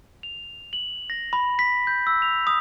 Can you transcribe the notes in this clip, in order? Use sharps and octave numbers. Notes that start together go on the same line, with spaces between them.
F7
F#7
A#6
B5
B6
G6
E6
F7
D#6